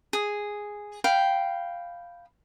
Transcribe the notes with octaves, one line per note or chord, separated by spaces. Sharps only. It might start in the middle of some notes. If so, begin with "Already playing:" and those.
G#4
F5 G5 B5